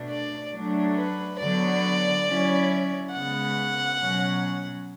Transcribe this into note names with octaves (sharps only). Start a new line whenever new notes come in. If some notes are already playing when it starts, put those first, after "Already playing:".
Already playing: B2 A3 D4
D5
F#3 A3 D4
B4
D3 F#3 B3 D5
F#3 C#4 E4
C#3 G#3 B3 F#5
B2 F#3 C#4